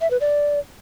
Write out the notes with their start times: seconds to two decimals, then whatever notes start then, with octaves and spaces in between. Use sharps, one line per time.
0.01 E5
0.11 B4
0.21 D5